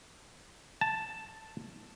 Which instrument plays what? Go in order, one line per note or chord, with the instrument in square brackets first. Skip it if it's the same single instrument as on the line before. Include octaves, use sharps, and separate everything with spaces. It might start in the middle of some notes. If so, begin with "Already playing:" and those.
[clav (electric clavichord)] A5